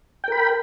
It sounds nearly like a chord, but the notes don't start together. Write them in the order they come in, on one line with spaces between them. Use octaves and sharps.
G5 A#4 B5